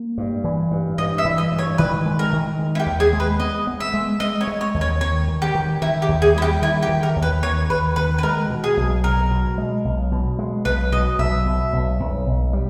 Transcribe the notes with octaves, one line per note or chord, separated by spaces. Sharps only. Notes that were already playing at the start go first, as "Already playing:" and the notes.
Already playing: A#3
G2
E3
G2
G2 D#5
E5
E3
D#5
G2
C#5
D#3 B4
G#3
A#4
D#3
G#3
E4
G4
D#2
G#4
G#3
B4
B3 D#5
B3
E5
G#3
G#3 D#5
C#5
G#3
C#5
D#2
C#5
D#3 C#5
D#3
G4
D#3
D#3 E4
G4
D#2
G#4
G3 E4
G4
D#3 E4
G4
D#3
A#4
D#2
B4
D#3 C#5
D#2 B4
D#3 B4
B4
G#3 A#4
B2
G#4
B1
B1 A#4
B2
G#3
B1
B2
G#3
B1 B4
B2 D#5
B1 E5
B2
B1
B1
B1
G3